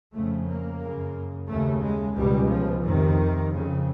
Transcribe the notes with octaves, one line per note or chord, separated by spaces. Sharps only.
F2 C#3 A3
A#3
F#2 C#3
D#2 C#3 A3
G#3
C#2 B2 G3
F3
F2 C3 D#3
F2 C#3